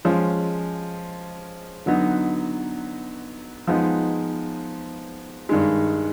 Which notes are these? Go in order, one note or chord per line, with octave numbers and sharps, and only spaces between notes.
F3 G#3 C#4
D3 F#3 B3 D#4 F#4
F3 G#3 B3 D#4
G2 D#3 G#3